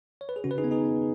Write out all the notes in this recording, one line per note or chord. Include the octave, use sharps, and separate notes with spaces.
C#5
B4
G#4
C#3 C#4 F#4
B4
D#4 G#4
B3
D#4 G#4
B3